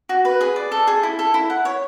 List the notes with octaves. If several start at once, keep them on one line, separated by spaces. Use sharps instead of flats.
F#4
B4
G#4
D5
A4
G#4
E4
A4
E4
F#5
C#5